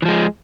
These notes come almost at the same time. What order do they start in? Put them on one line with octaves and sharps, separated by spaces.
E3 F3 G#3